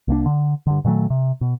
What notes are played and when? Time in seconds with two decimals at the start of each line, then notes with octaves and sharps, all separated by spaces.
0.08 C2 A#3 D4
0.26 D3
0.67 G2 D3
0.85 A#2 D#3 F#3 A3
1.10 C3
1.41 B2